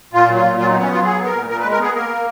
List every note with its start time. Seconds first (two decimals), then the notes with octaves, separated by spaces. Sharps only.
0.13 A#2 F4
0.29 F#3
0.36 F4
0.44 A#2
0.58 F#3 F4
0.70 D#4
0.74 B3
0.81 C#4
0.89 F#3 F4
1.04 B3 G#4
1.19 B3
1.26 A#4
1.34 A#2
1.49 A#2 A#4
1.60 B4
1.64 G#3
1.71 A#4
1.79 B3 G#4
1.94 A#3 A#4
2.09 A#3